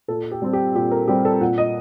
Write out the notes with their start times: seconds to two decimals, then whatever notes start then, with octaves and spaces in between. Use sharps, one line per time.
0.08 A#2 A4
0.31 G4
0.42 G3 C4
0.53 G4
0.75 A#2 G4
0.91 A#4
1.08 G3 C4 G4
1.25 A4
1.41 A#2 F#5
1.58 D#5